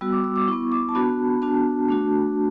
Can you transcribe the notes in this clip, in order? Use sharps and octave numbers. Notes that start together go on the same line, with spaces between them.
G3 B3 F#4 E6
D6
E6
D6
B3 E4 C#6
D6
A5
B3 D4 F#4 B5
B3 D4 F#4 A5
A3 D4 F#4